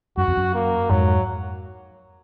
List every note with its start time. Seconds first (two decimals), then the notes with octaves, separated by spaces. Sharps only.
0.17 F#2 F#4
0.28 F2
0.37 F#2
0.54 A#3
0.90 F2 G#2 F#3